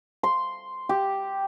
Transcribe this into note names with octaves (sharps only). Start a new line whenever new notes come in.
C6
G4